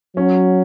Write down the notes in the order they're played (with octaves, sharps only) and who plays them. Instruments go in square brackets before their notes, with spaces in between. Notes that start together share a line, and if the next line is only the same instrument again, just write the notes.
[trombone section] F#3 [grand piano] C#4